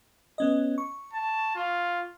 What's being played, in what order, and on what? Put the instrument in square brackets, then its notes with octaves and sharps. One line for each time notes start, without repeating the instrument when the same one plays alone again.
[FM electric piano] B3 C#4 D#5
C#6
[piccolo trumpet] A5
F4